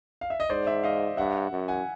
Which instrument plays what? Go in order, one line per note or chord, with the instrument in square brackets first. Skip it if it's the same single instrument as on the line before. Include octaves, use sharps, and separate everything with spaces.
[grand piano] F5
E5
D#5
[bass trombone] G#2 [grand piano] C5 D5
[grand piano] D5 E5
D#5 F5
[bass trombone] G2 [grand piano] E5 F#5
[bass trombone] F#2
[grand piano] F#5 G#5